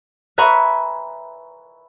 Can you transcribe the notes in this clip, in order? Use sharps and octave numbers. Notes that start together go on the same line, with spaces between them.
B4 E5 G#5 A#5 B5 C#6